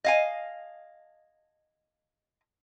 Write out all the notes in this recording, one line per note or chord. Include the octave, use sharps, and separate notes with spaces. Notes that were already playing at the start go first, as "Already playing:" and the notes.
D#5 F5 G#5